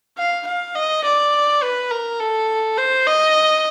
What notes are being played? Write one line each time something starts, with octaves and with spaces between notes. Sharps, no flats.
F5
F5
D#5
D5
B4
A#4
A4
C5
D#5